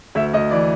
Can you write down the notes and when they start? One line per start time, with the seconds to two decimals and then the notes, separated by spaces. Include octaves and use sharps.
0.15 D2 E5
0.33 D2 D#5
0.51 E3 D5